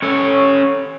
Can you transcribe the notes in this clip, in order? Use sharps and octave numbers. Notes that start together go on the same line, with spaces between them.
C#4 A4 C#5